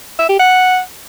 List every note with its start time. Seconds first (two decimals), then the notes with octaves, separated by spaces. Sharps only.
0.19 E5
0.29 G4
0.39 F#5